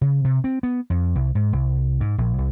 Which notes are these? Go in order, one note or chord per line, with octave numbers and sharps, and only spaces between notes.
C#3
C3
C4
B3
F2
C2
G#2
C2
G#2
A#1
C2